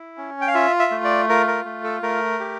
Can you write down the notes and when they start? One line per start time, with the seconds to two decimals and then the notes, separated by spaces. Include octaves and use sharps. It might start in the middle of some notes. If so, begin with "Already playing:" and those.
Already playing: E4
0.18 C#4
0.41 G5
0.48 F5
0.54 F4 E5
0.80 E5
0.91 A3
1.04 D5
1.29 F4 A#4
1.47 A#4
1.65 A3
1.84 A4
2.03 A3 A#4
2.40 G4